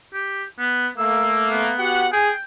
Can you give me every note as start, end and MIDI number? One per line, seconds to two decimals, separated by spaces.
0.14 0.43 67
0.59 0.87 59
0.98 1.72 57
0.98 1.72 58
0.98 1.47 88
1.51 2.06 59
1.80 2.07 66
1.80 2.07 67
1.80 2.07 78
2.13 2.32 68
2.13 2.40 79